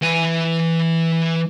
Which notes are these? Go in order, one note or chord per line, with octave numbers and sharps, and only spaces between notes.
E3 G#5